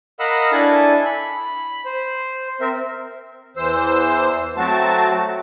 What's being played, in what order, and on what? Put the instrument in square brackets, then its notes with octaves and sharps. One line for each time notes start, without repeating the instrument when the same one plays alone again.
[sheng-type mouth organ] A#4 D#5 F5 F#5 B5 E6
D4 E4 A4 G#5 A5
B5
C5
C4 A#4 E5
[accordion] E2 E3 C5 E6
F#3 A3 C4 F#4 A5